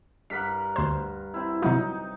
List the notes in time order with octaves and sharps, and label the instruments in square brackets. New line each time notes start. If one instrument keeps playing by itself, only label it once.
[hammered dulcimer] G2 A#4 F#5 [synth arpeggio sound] B6
[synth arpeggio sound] D2 C5
[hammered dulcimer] C4 E4
[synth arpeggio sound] C3 F#3 E4 [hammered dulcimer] D#4